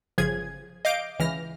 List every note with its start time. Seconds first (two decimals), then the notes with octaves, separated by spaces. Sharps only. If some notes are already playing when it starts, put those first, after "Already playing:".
0.18 G1 C#3 F3 G#4 G#6
0.85 D#5 F5 D6 G6 D7
1.19 C#2 E3 F6 A#6